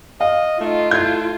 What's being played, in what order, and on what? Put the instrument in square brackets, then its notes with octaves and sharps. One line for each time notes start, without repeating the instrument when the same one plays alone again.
[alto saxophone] D#5 [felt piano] F5
[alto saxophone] A3 [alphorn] D#4 [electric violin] F4
[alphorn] A3 [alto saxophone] E4 [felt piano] G6 G#6